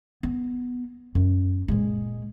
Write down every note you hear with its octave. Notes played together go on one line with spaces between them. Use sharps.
B3
F#2
A#2 G#3